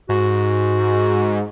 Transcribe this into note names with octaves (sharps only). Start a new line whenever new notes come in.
G#2 F#4